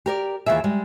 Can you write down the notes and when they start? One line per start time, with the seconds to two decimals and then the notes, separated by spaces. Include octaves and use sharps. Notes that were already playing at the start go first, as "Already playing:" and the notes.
0.06 G4 A#4 D5
0.46 D#2 E3 F4 G#4 E5
0.64 G3 G#3